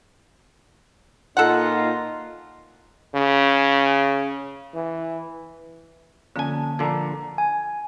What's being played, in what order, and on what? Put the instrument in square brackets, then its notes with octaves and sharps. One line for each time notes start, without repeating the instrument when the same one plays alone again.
[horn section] A#2 D#4 F4 [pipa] A4 F#5
[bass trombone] C#3
E3
[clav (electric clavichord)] F2 G#5 [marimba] D3 A#3 [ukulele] C#4 A4 A5
[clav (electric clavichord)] A#2 D3 [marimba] F3 [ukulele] D5 A5 A#5
[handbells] G#5